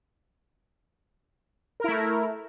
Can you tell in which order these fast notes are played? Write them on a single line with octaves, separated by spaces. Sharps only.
A#4 E4 A3